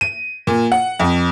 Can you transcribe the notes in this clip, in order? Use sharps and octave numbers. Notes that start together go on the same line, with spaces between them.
D#7
A#2
F#5
F2